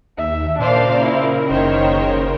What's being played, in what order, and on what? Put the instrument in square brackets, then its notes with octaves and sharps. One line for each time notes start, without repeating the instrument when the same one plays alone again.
[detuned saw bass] D#2 [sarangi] E5
[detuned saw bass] A#2 [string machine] C#3 A#4 [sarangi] D4 [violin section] C5 D5 F5
[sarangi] E4
[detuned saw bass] F#1 [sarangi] D#3 [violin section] C5 C#5